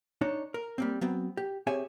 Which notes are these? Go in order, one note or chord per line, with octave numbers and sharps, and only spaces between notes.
D4 D#4 C#5
A#4
G3 A#3 C4
F#3 B3 C4
G4
C4 G4 G#4 C#5 E5 G#5